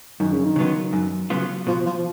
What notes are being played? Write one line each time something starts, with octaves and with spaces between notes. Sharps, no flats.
F#2 D#3
C#3
D#3
C#3 F#3 B3 F4
F#2
C#3 F#3 B3 F4
B2 F3
F3